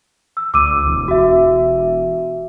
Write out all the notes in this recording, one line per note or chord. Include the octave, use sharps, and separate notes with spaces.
E6
D2 D6 E6 D#7
E1
F#4 E5